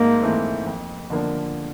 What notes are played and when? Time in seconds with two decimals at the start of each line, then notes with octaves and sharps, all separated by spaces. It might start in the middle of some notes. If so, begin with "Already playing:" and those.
Already playing: G#2 A3 A#3 C4
0.22 E3 A3 C4
0.66 F2
1.10 D3 F3 A#3 D4